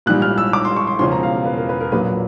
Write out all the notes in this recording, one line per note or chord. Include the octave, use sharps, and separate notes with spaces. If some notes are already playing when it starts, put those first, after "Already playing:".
A#1 G#2 E3 G3 F#6
F6
E6
D6
C6
C#6
C6
E1 E2 C#3 F3 C6
A#5
F5
B4
A#4
B4
A#4
A#1 A#2 F#3 B4